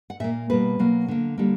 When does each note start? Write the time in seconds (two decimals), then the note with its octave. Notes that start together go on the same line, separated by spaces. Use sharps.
0.10 F#5
0.20 A#2 E5
0.24 A#3
0.50 B2 G3 A#3 B4
0.79 B2 F#3 A#3
1.08 D3 A#3
1.38 D3 G3 A#3